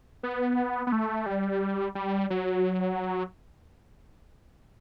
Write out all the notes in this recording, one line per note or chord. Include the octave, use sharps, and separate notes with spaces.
B3
B3
A3
G3
G3
F#3